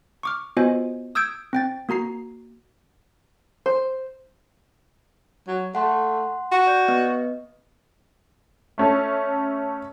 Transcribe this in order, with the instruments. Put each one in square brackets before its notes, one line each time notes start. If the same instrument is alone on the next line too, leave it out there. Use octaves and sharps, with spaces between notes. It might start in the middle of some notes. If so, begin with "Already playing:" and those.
[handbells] C#6 D6 F6
B3 F4 F#4 C5 D#5 G#5
D#6 E6 G6 G#6 D7
C4 G5 A6
A#3 F#4 A#5 C7
[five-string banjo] C5
[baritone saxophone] F#3
[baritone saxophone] A3 [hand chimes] F#5 C6
[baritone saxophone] F#4
[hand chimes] D5 G6
B3 B4 D#5
[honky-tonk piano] A3 C#4 A4